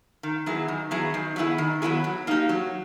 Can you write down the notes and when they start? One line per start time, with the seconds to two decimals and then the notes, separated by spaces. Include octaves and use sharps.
0.23 D#3
0.46 F#3 B3 E4 G#4
0.68 D#3
0.91 F#3 B3 E4 G#4
1.14 D#3
1.36 F#3 B3 E4 G#4
1.58 D#3
1.82 F#3 B3 E4 G#4
2.04 F#3
2.27 A#3 D#4 G4
2.49 F#3